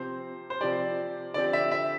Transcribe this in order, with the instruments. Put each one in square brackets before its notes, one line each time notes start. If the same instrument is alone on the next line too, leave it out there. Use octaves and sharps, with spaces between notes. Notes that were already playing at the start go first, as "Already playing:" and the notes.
Already playing: [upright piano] C3 F3 C4 G4 [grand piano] C5
[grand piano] C5
[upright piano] C3 F3 C4 G4 [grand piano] D5
[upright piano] D3 F3 C4 G4 [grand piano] D5
[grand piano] E5
E5